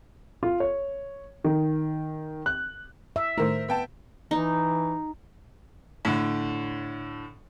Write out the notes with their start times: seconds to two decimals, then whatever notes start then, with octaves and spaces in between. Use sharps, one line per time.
0.43 F4
0.60 C#5
1.44 D#3
2.46 F#6
3.16 E5
3.38 A2 D#3 A3 A#4 C5
3.69 B3 G5 A5
4.31 E3 D#4
6.05 A2 D3